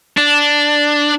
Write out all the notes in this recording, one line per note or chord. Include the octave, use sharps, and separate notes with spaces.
D4